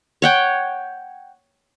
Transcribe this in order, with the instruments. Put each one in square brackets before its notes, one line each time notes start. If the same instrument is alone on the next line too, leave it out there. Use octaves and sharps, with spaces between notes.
[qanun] C#5 F#5 G5